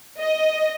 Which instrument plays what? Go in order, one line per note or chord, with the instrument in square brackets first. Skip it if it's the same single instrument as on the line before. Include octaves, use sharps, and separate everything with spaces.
[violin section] D#5